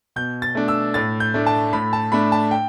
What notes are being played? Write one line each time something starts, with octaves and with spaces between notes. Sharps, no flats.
B2 G6
A6
A3 D4
E6
A2 A6
G6
A3 D4
A5
A2 B5
A5
A3 D4 B5
A5
G5